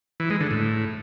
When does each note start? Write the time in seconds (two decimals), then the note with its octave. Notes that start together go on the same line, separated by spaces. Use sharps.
0.20 E3
0.30 G#3
0.40 D3
0.51 A2